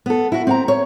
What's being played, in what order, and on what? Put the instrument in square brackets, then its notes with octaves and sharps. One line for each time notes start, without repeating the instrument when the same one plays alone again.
[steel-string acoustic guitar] B3 A4
E4 F#4
C4 F#5 A#5
C#5